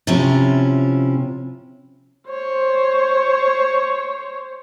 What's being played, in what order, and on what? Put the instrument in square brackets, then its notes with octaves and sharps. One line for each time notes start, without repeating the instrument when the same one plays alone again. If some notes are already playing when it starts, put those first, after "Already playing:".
[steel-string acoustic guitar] C3 F3 C#4 E4 F4
[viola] C5 C#5